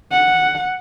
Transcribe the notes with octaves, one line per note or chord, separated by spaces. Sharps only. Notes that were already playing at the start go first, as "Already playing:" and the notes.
F#5